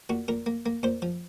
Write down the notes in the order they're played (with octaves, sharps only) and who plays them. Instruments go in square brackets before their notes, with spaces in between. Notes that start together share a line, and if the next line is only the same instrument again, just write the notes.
[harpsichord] A#2 F#4
A#2 A#4
A#3
A#3
A#2 C5
F3